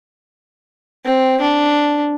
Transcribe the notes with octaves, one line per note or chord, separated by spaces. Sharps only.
C4
D4